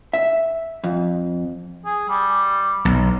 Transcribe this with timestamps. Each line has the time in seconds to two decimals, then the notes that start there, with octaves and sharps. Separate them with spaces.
0.14 E5
0.84 F2
1.85 G#4
2.09 G3
2.85 B1